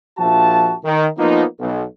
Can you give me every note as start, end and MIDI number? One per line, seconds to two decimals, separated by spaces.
0.18 0.74 34
0.18 0.74 53
0.18 0.74 66
0.18 0.74 76
0.18 0.74 81
0.84 1.07 51
1.18 1.44 53
1.18 1.44 58
1.18 1.44 59
1.18 1.44 63
1.60 1.84 35